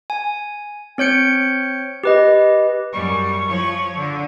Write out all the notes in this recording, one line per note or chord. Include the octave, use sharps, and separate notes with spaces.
G#5
C4 C#5 G6 C#7 D7
G4 B4 D#5
F#2 G3 C#6
F3 C#5
D3